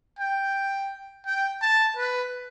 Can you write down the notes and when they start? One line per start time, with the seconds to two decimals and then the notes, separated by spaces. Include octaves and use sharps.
0.19 G5
1.26 G5
1.62 A5
1.97 B4